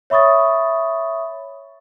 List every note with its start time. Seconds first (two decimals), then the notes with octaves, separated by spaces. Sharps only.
0.10 C#5 E5 B5 C#6 D#6 A6